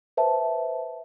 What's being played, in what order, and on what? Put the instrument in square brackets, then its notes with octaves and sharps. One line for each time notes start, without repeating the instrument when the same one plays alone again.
[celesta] B4 C5 E5 A5